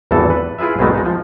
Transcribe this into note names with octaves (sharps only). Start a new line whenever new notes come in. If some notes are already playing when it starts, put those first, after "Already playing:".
G#1 E2 G2 E3 A4 A5
B4
E4 F4 G#4 B4 E5
C2 G#2 B2 G#3 A3 A5
G#3 D#4
F3